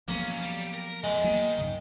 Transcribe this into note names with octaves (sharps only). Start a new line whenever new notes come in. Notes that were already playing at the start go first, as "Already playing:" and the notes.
B1 F3 F#3 A#3 B3 C#4
G3 G4
A#4
E2 G#3
D#3 F#3 A#3 B3
G2 C#3